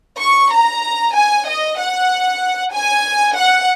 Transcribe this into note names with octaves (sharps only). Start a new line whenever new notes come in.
C#6
A#5
G#5
D#5
F#5
G#5
F#5